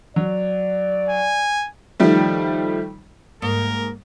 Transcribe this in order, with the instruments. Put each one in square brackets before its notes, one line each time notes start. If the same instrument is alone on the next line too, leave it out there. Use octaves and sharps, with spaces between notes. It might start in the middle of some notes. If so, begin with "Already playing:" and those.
[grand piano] F#3 [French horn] D5
[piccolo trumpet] G#5
[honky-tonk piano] D#3 F3 G3 A3
[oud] G#2 [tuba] A#3 [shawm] A#4